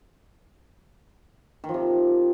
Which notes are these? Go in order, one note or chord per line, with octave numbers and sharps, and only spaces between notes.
D#3
F3
C3